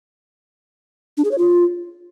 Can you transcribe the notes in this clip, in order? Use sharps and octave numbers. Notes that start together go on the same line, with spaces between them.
D4
G#4
C#5
F4